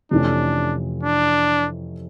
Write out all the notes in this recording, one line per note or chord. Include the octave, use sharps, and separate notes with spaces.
F2 C3 E3 A3 C#4 D4
D4